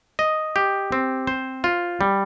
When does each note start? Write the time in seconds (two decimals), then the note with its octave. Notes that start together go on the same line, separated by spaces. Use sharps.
0.19 D#5
0.56 G4
0.92 C4
1.27 C5
1.64 F4
2.01 G3